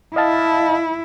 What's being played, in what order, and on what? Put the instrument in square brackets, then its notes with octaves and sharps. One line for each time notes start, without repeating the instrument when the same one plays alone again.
[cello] E4 [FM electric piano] D#5 F5 A5